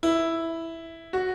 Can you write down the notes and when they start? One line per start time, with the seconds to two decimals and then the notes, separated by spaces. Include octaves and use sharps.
0.03 E4
1.13 F#4